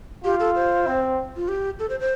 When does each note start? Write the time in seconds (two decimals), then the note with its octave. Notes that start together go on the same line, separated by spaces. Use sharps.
0.24 F4 G4
0.40 A4
0.55 C5
0.87 C4
1.36 F4
1.48 G4
1.79 A4
1.89 C5
2.00 C5